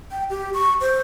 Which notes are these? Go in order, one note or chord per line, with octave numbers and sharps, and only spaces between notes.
G5
G4
C#6
C5